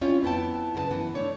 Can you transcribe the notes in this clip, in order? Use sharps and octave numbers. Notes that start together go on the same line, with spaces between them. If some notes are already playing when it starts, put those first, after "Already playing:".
G3 C4 C#4 E4 F4 C#5
F2 B3 E4 G5 A5
F#2 C#3 A#4 B4 A5
F#2 E3 B3
A3 D4 C#5 D5